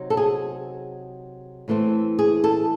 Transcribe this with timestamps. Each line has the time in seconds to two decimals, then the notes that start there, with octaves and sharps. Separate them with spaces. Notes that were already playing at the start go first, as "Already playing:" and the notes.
Already playing: C3 F#3 C4 D#4
0.10 A4
0.17 G#4
1.68 A2 E3 A3 C4
2.19 G#4
2.44 A4